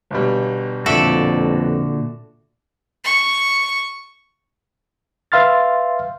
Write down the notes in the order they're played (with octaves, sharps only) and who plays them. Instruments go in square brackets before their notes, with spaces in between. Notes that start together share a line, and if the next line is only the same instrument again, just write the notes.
[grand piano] G1 B2 G3
[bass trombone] F2 [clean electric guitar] A#2 D3 F#4 [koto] A4 D5 E5
[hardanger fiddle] C#6
[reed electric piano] B4 E5 F5 C6 F6 A6